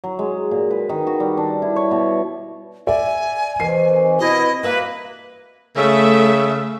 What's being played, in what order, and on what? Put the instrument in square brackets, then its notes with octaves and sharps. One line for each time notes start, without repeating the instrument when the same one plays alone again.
[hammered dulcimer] F#3
G#3
A#2
B4
D#3
F#4
G3
D4
E4
C#5
B2
[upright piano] D5 E5 [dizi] G#5
[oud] C3 [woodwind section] D#3 E3 [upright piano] C7
[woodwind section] B2 E4 [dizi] D#5
[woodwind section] A#3 [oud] F#4 E5 F5 [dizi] B4
[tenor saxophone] C#3 [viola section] A3 E5